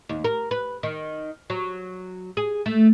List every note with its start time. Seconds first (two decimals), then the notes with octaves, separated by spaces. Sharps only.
0.09 D#2
0.24 A#4
0.51 B4
0.83 D#3
1.50 F#3
2.37 G#4
2.66 A3